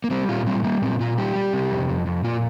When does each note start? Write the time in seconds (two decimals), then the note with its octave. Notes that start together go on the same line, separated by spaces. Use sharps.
0.04 A#3
0.11 G3 C4
0.29 A#2 F4
0.47 G3 C4
0.64 G3 A#3
0.82 A#2 C4
1.00 A#2 F4
1.18 G3 G4
1.35 G3
1.53 C3
1.71 F2
1.89 F2
2.07 F2
2.24 A#2 F4